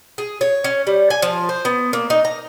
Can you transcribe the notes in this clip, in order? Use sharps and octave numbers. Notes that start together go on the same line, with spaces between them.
G#4
C#5
C#4
G3
G#5
F3
C5
B3
A#3
D#4
A#5